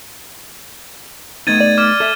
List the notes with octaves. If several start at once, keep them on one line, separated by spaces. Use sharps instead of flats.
A3 B3 D#4 G#6 A6 D#7
D5
D6 F6
A4 E5